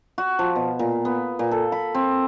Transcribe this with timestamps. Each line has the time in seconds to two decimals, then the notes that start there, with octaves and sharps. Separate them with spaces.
0.18 F#4
0.39 F3
0.56 B2
0.79 A#2
1.05 B3
1.39 A#2
1.51 A4
1.72 B5
1.95 C4